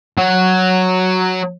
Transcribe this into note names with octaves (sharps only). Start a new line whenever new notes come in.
F#3